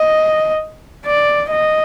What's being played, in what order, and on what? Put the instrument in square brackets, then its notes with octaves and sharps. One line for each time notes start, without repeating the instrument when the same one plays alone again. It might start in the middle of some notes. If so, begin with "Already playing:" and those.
Already playing: [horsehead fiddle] D#5
D5
D#5